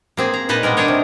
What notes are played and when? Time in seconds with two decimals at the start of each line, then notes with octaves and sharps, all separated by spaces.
0.17 A#3 C4 G#4
0.34 A#5
0.49 A#2 D#4 B4 D#5 A5
0.63 B2 G3 G#3 A#4
0.77 D4 D#4 A#4 C#5 D#5
0.88 C3